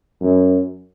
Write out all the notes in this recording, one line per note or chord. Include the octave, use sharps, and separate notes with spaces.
F#2